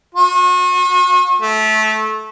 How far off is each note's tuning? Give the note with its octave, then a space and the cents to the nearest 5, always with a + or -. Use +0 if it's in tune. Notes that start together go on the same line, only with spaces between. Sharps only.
F#4 -40
A3 -20